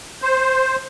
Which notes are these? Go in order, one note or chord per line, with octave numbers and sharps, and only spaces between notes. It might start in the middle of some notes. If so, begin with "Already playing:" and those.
C5